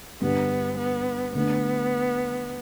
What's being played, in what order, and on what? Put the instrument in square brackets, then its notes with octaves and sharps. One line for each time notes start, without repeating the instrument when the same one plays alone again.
[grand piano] G2 D3 G3 D4 [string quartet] B3
[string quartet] B3
[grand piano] D3 A3 D4 [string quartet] B3